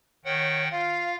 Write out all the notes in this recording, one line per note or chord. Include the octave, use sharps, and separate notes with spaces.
D#3 C#5 F#5 G5
F4 F5